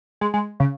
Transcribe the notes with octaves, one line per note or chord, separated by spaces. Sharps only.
G#3
G#3
C#3